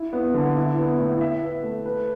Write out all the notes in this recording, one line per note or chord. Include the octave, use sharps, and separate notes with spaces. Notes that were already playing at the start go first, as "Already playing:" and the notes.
Already playing: E4
B3
D3
E4
B3
A2
E5
B4
A3
B4